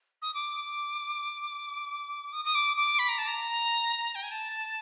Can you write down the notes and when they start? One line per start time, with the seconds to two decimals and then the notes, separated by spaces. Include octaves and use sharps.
0.22 D#6
0.34 D6
2.33 D#6
2.45 D#6
2.55 D6
2.77 D6
2.99 B5
3.09 A#5
3.18 A5
3.27 A#5
4.15 G5
4.23 G#5
4.31 A5